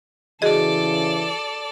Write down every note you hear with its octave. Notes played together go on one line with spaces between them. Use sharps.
C#3 E3 F#4 G#4 A4 D5 D#5